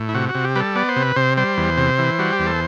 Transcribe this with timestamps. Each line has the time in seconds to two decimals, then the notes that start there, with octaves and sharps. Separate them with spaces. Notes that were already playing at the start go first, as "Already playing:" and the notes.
Already playing: A2
0.09 E4
0.14 C3 F#4
0.29 F#4
0.35 C3
0.44 G4
0.56 G3 B4
0.60 A4
0.76 B3 D5
0.89 C5
0.96 C3
1.03 B4
1.16 C3 C5
1.37 G3 C5
1.58 E2
1.78 C3
1.99 E3
2.19 G3 F#4
2.33 G4
2.39 E2
2.47 A4